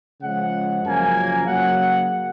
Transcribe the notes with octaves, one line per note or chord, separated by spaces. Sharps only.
C#3 F3 G#3 F#5
F#2 C#3 F3 A#3 G#5
C#3 F#3 A#3 F#5